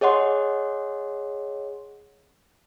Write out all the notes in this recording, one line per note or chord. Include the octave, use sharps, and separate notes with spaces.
G#4 C#5 D#5 F#5 C6